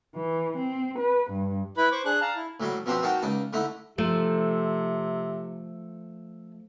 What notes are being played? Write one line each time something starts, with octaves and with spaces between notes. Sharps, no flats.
E3
C4
B4
G2
E4 B4 B5
C5 C#6 D6
D4 G#4 F#6
F5 A5 A#5
E4
A2 F#3 G3 D5
B2 F3 C4 D4 G4
D#3 D#4 F#4 G5 A5
C#2 D#4 D5
D3 A3 D#4 E4
C3 F3 A3